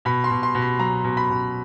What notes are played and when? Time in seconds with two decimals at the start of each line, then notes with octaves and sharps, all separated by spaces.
0.05 B2 B5
0.24 C6
0.31 B2
0.43 C6
0.55 B2
0.62 B5
0.79 F#3 A#5
1.04 B2
1.17 B5
1.30 B2